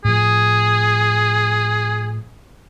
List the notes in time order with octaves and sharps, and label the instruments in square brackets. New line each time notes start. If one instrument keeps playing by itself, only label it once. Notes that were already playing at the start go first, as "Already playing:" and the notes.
[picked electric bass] A2 F3 [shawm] G#4